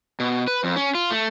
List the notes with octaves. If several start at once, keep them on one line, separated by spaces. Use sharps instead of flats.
B2
B4
F2
C#4
F4
A3